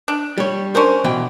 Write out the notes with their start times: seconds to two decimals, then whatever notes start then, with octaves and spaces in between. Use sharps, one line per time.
0.08 D4
0.38 G3 C#5
0.75 C#4 D4 A#4 C5
1.04 B2 E3 G5